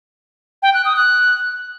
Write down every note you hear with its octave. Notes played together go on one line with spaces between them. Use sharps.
G5
F#6
D#6
F#6